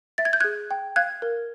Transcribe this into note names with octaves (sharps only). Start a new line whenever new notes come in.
E5 A6
G#6
G6
G#4 F#6 G#6
G5
F5 F#6 G#6
A#4